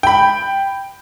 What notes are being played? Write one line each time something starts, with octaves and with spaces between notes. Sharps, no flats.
G5 B5